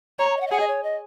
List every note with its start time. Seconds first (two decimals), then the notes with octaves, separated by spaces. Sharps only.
0.19 C#5 A#5
0.30 A#5
0.37 D#5
0.41 F#5
0.47 D#5
0.51 G#4 F#5
0.60 D#5
0.67 C#5
0.83 D#5